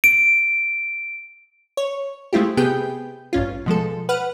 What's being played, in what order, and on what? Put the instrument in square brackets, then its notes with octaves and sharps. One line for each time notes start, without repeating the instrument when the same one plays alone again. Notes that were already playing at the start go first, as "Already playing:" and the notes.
[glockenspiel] D7
[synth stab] C#5
G#3 A3 C4 E4 F4 G4
C3 B3 G4 G#4 G5 G6
A1 G2 C#4 F4
B2 F3 G#3 A4
B4 F#5 F6